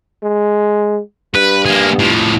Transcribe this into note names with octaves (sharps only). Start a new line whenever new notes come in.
G#3
G2 B4
A#3 G#4
A2 F3